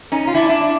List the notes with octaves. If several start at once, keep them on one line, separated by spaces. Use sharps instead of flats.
C#4 D#4
F4
D4 E4
D4 E4